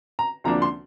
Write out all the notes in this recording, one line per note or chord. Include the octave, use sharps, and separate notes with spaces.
A#5
D2 C3 F3 A#3 D4 A#5
C6